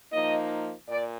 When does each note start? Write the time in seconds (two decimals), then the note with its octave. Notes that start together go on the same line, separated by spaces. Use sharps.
0.12 F3 A#3 D#4 D#5
0.89 A#2 D5